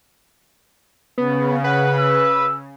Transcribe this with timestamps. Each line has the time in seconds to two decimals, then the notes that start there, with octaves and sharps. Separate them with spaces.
1.18 C#3 B3
1.64 B4 F#5
1.99 E6